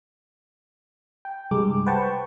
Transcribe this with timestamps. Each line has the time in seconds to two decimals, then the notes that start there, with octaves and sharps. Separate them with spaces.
1.25 G5
1.51 C2 G2 G#3 D6
1.86 B4 C5 F#5 G5 A5 C#6